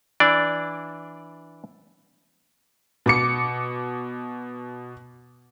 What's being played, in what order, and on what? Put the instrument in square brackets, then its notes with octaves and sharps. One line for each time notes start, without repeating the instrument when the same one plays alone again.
[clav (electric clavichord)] E3 D4 D5
[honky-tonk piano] B2 D6 C#7